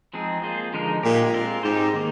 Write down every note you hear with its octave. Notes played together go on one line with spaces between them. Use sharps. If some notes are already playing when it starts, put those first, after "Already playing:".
F3 G#3 C4 D#4 G#4
A#3 F4 G#4 C5
D3 F3 G#3 D#4 A#4
A#2 G#3 D#4 G4
G#3 C4 F4 A#4
G#2 C4 D#4 G4 C5
D#3 A#3